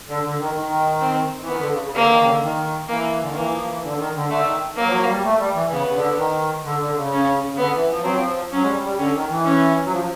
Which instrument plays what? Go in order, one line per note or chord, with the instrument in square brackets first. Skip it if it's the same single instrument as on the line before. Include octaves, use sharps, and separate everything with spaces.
[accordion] D3
D3
D#3
D#3
[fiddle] C4
[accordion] E3
[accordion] D#3 [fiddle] B3
[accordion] D3
C#3
C#3
[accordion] D3 [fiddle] A#3
[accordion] D#3
C#3
D3
D#3
[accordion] E3 [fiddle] A#3
[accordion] D3
D#3
[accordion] E3 [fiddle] A#3
[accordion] F3
E3
D3
D#3
D3
[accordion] D3 [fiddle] A3
[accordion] D#3
[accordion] F#3 [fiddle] A#3
[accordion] F3
F#3
G3
A3
G3
E3
[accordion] C#3 [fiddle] B3
[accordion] C#3
D3
D#3
D3
D3
C#3
[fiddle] C#4
[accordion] C#3
[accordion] D3 [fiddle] B3
[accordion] E3
F3
[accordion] F#3 [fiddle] C4
[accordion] F3
[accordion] F#3 [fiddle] C#4
[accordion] G#3
G3
G3
[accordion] D3 [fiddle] C#4
[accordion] D#3
E3
[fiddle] C#4
[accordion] F#3
F3